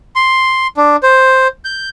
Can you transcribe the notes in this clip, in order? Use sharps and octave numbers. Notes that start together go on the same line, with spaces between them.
C6
D4
C5
G6